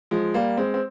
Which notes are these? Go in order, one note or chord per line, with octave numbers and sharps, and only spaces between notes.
F3 G#3
G3 A#3
G#3 C4
C4